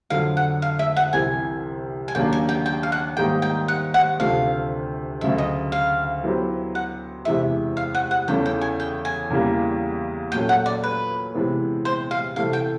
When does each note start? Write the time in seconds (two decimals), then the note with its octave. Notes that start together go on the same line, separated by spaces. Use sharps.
0.10 F2 D3 F#3 F5
0.37 F#5
0.62 F5
0.79 E5
0.96 F#5
1.13 C2 C3 E3 G#5
2.08 G#5
2.15 D#2 C#3 F#3 A#3 D4 G5
2.33 G#5
2.49 G5
2.66 G5
2.83 F5
2.92 F#5
3.17 G#2 D#3 G3 A#3 D#4 G5
3.42 G5
3.68 F#5
3.94 F#5
4.19 D2 C3 F3 A3 D4 F5
5.21 D2 C#3 F#3 E5
5.38 D#5
5.72 F5
6.24 F#3 B3 E4 G4 C5
6.75 F#5
7.25 E2 C3 E3 G#3 E5
7.77 F5
7.95 F#5
8.11 F#5
8.28 E2 C#3 E3 A3 C#4 G5
8.46 G5
8.61 G#5
8.80 G5
9.05 G#5
9.30 E2 C#3 E3 G3 A#3
10.32 A#2 F#3 A3 C#4 G5
10.49 F#5
10.66 D5
10.84 B4
11.34 C3 E3 G#3 B3 E4
11.85 C5
12.11 F5
12.36 C3 E3 A3 F5
12.53 G5